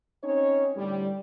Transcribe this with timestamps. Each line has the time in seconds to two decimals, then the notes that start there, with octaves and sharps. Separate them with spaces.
0.23 C4 C#4 D#4 C#5
0.77 A2 D3 G3